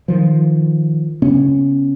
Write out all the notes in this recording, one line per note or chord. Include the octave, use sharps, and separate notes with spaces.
D#3 F3
C#3 B3 C#4